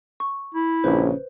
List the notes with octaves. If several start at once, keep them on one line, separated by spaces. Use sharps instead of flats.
C#6
E4
A#1 C#3 B4 C5